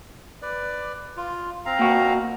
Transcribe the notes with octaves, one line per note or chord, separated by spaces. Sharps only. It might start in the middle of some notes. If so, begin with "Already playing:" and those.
B4 D5
F4
C4 F5 A#5
A#2 F#4